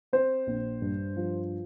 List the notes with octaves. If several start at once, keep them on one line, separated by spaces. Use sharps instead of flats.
C4 C5
A#1
G2
F3